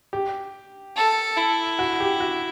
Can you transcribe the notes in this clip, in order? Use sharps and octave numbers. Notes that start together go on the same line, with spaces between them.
G4
A4
E4
F#4
G4
F#4